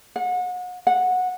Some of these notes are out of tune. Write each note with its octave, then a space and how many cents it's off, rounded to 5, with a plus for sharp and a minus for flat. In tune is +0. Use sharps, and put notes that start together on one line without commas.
F#5 -35
F#5 -15